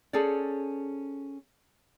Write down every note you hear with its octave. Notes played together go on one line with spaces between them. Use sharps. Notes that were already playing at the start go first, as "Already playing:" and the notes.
C#4 G#4 A4 C5 D5